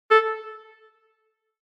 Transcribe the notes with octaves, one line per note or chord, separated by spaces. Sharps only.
A4